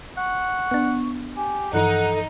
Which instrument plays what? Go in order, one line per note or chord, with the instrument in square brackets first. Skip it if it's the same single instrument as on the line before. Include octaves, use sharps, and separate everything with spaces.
[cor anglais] F#5 [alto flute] C#6
[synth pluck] B3 D4
[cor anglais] G4 [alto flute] G#5
[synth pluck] G2 E3 F3 [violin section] D#4 [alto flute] A4 [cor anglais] F#5